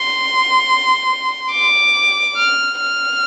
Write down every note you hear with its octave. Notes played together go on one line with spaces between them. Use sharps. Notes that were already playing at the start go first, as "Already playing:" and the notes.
Already playing: C6
D6
F6
F6